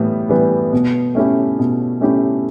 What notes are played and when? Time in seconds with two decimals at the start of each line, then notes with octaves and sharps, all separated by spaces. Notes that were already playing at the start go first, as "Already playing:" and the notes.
Already playing: A2 E3 G3 B3
0.29 E3 G3 B3
0.73 B2
1.15 A3 C#4 E4 G4
1.59 B2
2.01 A3 C#4 E4 G4